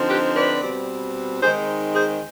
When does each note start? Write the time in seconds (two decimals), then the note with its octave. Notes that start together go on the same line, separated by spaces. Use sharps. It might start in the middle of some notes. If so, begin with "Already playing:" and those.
Already playing: D3 F3 C4 D#4
0.09 G4 B4
0.35 B4 D5
0.62 B2 G3 C4
1.42 D#3 G#3 C4 D#4 G#4 C5
1.95 G#4 C5